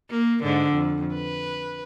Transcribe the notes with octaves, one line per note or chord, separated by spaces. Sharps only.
A#3
G#2 D3
F2
B4